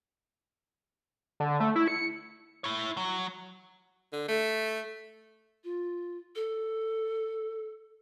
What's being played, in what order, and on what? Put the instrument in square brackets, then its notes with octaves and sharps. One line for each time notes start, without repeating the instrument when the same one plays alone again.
[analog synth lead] D3
A3
E4
C#7
[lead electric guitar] E4 C#5
F#3
[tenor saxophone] D3
A3
[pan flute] F4
A4